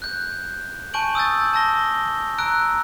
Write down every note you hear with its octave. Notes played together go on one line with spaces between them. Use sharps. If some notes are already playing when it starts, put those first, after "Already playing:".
F#6 G6
G#5 A5 C#6 G6 D7 F#7
D#6 E6 G6 A6
A5 E6 A#6 G7
A#5 E6 F#6 D7